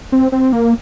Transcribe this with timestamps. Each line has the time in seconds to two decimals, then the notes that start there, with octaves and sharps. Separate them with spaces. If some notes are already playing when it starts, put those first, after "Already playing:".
0.12 C4
0.32 C4
0.53 A#3